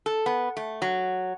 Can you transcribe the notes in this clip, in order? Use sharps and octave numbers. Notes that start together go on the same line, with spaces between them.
A4
B3
A3
F#3